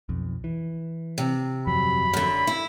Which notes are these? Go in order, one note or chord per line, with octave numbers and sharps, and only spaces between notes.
B1 F2
E3
C3
G1 F2 F#3 B5
F#2 D3
E4